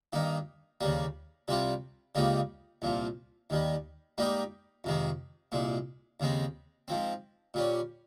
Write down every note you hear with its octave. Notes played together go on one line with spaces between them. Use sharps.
G2 D#3 A#3 D#4
D#2 C#3 G3 A#3
C2 C3 G3 C4 F4
C#2 C#3 G3 A#3 D#4
C2 A#2 F3
D#2 D#3 G3
G#2 G3 A#3 D#4 G4
F2 C3 D#3 G#3
C2 A#2 G#3
D#2 C#3 G#3 C4
G#2 F3 C4
A#2 G3 C#4